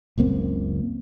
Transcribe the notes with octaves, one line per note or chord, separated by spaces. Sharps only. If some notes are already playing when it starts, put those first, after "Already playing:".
F#1 C#2 A#3 C4